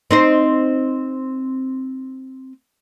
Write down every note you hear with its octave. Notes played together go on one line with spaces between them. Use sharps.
C4 D#4 C5